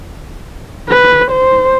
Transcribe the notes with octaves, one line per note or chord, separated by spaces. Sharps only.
B4
C5